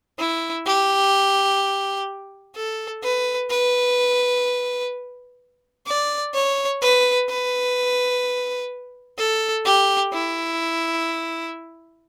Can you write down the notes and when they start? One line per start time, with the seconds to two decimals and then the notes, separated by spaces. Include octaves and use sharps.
0.19 E4
0.66 G4
2.55 A4
3.03 B4
3.50 B4
5.87 D5
6.34 C#5
6.81 B4
7.29 B4
9.18 A4
9.65 G4
10.13 E4